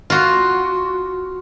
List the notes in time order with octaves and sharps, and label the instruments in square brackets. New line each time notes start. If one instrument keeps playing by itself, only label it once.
[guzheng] F4 F#4